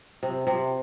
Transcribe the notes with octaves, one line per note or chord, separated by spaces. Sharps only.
C3
C3